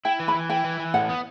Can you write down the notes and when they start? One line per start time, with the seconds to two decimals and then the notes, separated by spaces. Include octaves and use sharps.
0.05 E4 G5
0.20 E3
0.28 B5
0.34 E3
0.50 E4 G5
0.64 E3
0.79 E3
0.94 A2 F#5
1.09 B3